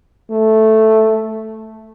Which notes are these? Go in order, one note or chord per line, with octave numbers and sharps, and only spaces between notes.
A3